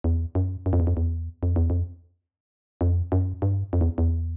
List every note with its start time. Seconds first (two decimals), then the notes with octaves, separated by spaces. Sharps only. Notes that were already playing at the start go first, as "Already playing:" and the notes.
0.04 E2
0.35 F#2
0.66 F#2
0.73 F2
0.80 E2
0.87 F2
0.97 E2
1.43 F2
1.56 E2
1.70 F2
2.81 F2
3.12 F#2
3.42 G2
3.73 F2
3.81 E2
3.98 E2